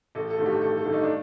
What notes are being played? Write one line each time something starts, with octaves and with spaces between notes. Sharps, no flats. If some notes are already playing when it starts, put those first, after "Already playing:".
A1 A4
A4
G2 D#3 A3
G4
A1 A4
A4
G2 D#3 A3
D#4
D4